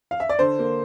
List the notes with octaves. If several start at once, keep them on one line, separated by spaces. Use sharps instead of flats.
F5
E5
D5
D3 C5
A#3